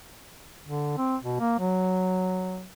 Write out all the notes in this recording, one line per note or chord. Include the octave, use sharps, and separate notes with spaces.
D3
C4
B2
A#3
F#3